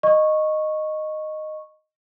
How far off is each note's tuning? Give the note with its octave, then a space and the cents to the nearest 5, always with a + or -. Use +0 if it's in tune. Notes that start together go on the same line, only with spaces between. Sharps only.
D#5 -10 C#6 -10